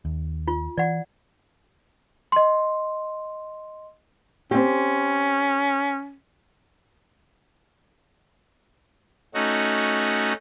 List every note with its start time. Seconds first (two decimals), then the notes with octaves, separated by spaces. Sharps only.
0.05 D#2
0.48 F4
0.78 E3 D5 F#5
2.32 D#5 C6
4.51 C4 C#4 G4
9.34 A3 C#4 D#4 F#4